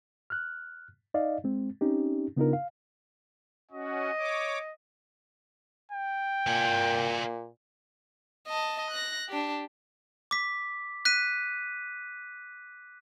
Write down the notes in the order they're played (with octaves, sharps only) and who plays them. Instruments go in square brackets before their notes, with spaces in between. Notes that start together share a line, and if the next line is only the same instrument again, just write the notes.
[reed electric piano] F6 F#6
D#4 D5 D#5 F5
G#3 C4
C4 C#4 D#4 G4
C#3 B3 D4 D#4 F4 A#4
F5
[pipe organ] C#4 F#4 [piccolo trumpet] D#5
[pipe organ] C#5 D6
[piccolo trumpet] G5
[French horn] A#2 [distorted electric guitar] A#3 G#5
[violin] D#5 A5
F#6 A#6
D4 G4
[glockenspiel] D6 B6
F#6 B6 D#7